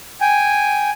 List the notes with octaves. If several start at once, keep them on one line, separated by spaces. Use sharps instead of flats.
G5 G#5